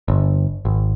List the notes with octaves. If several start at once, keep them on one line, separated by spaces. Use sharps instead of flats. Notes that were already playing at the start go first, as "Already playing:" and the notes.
G1
G#1